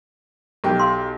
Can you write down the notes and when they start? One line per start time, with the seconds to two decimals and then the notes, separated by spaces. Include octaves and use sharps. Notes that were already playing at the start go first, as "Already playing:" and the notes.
0.64 B1 G4
0.79 F5 C6